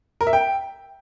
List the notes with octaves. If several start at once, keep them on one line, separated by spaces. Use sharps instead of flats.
A#4
E5
G5